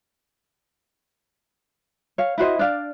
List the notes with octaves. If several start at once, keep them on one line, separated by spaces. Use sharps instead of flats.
C#5 F5
E4 F#4 C5 D#5
D4 D5 F5